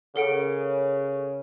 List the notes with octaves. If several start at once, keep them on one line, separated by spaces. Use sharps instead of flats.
C#3 A4 A#4 F#5 D7